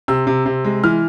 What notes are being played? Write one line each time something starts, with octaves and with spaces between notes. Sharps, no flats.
C3 E6
C3
C3
G#3
E3 F6